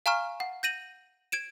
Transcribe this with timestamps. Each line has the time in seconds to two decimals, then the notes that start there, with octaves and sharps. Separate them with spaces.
0.06 F5 G#5 A#5 C#6 F6
0.40 F#5
0.63 G6 A#6 D#7 F#7
1.32 G#6 D7 E7